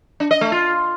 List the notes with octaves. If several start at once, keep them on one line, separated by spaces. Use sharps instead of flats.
D4
D#5
A3
F4